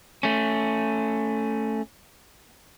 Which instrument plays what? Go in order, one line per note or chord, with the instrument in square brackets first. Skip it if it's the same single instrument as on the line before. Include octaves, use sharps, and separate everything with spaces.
[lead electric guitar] A3 C#4